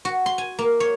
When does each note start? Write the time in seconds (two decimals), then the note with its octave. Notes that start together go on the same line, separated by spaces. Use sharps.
0.05 F#4
0.26 C6
0.38 G#5
0.59 A#3
0.80 C#5